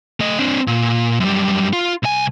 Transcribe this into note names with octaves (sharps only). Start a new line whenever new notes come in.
A3 D#5
C4 D4
A#2
F#2 G3
F4
C2 G#5